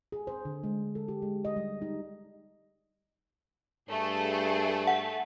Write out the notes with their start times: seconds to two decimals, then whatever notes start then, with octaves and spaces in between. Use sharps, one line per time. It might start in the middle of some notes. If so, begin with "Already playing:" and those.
0.12 G#4
0.27 C5
0.45 D3
0.64 G#3
0.95 A4
1.08 G4
1.22 G#3
1.45 D#5
1.56 G3
1.82 D#4
3.90 G2 A3 G#4 A4
4.87 F#5